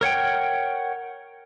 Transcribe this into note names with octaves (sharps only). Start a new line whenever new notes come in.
A#4 C#5 F#5 G5